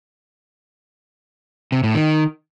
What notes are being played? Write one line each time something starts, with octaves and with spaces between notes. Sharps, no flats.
C3
A2
D#3